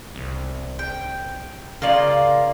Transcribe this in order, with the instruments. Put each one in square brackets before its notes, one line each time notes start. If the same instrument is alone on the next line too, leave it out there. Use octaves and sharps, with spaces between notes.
[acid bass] C2
[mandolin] G5
[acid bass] C#3 [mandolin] A#3 F4 D5